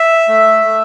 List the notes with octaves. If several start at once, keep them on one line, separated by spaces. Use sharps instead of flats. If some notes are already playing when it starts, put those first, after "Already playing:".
Already playing: E5
A3
A3